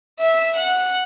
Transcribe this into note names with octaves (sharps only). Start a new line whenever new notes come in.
E5
F#5